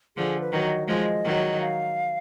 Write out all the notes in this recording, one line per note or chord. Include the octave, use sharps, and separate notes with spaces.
D3 F3 G#4
B4
D#3 F#3
D#5
F3 G#3 D#5
D#3 F#3
F5